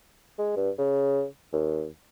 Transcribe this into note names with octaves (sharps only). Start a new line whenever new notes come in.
G#3
G2
C#3
D#2